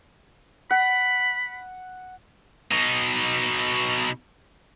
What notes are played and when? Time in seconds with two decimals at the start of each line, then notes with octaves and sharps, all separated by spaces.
0.71 F#5 B5
2.72 B2 D#4